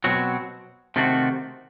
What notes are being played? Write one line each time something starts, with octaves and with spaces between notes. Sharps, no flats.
B2 F#3 C4 F#4
C3 D#3 A3 C4 F#4